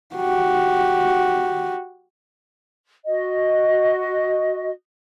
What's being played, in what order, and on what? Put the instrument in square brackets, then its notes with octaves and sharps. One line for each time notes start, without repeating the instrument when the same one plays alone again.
[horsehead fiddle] F#4 G4
[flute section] F#4 D#5